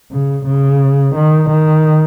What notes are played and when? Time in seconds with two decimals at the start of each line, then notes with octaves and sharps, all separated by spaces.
0.12 C#3
0.46 C#3
1.15 D#3
1.50 D#3